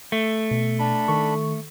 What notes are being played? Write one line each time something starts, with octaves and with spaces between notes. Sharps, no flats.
A3
B2
D4 B5
D#3 A4 C#6